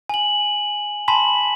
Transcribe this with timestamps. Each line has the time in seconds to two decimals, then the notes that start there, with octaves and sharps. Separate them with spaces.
0.09 G#5 F#7
1.08 G#5 A5 B5 C6 B6 F#7